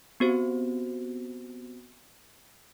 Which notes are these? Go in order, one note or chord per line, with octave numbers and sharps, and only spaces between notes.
B3 C4 F#4 G4 C5